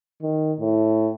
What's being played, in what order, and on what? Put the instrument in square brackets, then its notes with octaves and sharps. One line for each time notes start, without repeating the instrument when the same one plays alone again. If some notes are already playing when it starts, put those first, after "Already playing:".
[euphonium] D#3
A2